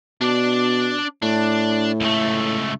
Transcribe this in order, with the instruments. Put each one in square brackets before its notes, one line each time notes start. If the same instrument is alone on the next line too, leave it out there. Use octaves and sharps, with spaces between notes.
[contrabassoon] B2 [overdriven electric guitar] D4 D5
[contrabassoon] A2 [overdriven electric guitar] D4
[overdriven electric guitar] C#2 A3